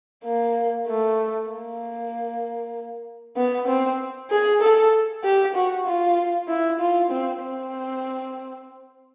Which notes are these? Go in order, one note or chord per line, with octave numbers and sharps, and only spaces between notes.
A#3
A3
A#3
B3
C4
G#4
A4
G4
F#4
F4
E4
F4
C4
C4